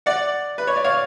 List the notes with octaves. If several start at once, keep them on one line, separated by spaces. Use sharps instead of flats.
D5 F#5
B4
C#5
D5
C#5 F5